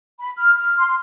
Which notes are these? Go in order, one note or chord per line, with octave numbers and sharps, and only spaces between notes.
B5
F6
F6
C6